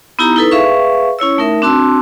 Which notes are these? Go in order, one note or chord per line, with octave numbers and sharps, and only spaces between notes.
B3 D#4 E4 G4 A#5
D#4 E4 A4 B4
G#4 B4 E5 F5 C#6
C#4 E4 C#5 E6
A3 D#4 A#4 E5
C4 D4 F#4 A5 C6 E6